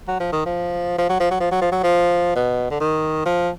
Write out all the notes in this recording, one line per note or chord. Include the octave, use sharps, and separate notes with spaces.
F#3
F3
D#3
F3
F3
F#3
F3
F#3
F3
F#3
F3
F#3
F3
B2
D3
D#3
F3